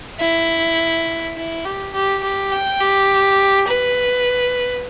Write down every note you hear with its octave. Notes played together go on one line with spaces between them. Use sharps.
E4
E4
G4
G4
G4
G5
G4
B4